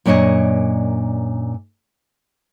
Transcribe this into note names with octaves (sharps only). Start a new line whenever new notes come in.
F#2 A#2 D4 C#5 D#5